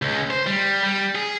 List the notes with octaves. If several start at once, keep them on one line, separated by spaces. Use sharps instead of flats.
C#2
C5
G3
G3
G#4